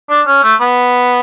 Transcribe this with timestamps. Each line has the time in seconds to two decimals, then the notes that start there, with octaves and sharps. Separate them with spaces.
0.10 D4
0.27 C#4
0.43 A3
0.61 B3